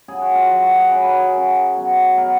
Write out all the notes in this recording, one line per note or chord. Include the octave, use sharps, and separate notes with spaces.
C#3 F#3 G#4
F#4
F4
C#3 F#3 F4
F#4
G#4
C#3 F#3 B4
A#4
G#4
C#3 F#3
B2 F#3
B2 F#3 A#4